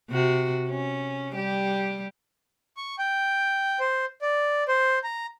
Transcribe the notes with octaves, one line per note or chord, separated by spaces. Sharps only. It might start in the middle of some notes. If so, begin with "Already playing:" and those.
C3 F#4
C#4
G3 G4
C#6
G5
C5
D5
C5
A#5